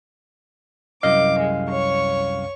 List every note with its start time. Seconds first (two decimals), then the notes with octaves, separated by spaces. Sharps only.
1.03 C2 F#2 D#5 F5 D6
1.39 G#3
1.71 C#5 C#6